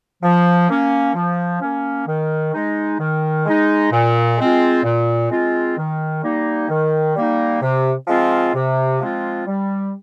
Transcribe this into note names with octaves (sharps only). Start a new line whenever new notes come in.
F3
A#3 C#4
F3
A#3 C#4
D#3
G#3 D#4
D#3
G#3 D#4
A#2
G#3 C4 F4
A#2
G#3 C4 F4
D#3
G3 A#3 D#4
D#3
G3 A#3 D#4
C3
F3 G#3 C4 F4
C3
F3 G#3 C4 F4
G3